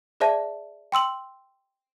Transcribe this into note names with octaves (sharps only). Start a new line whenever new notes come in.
G#4 C5 D5 E5 A5
G5 C6 E6 F#7